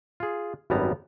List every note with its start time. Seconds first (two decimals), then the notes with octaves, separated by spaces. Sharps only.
0.20 F4 G#4
0.70 G#1 F#2 G3 B3 A5 A#5